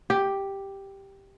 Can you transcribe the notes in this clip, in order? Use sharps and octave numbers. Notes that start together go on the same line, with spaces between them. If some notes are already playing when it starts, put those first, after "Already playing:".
G4